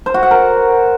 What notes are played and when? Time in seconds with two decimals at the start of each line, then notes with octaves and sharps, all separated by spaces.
0.06 C5
0.14 F#4
0.23 F#5
0.31 A#4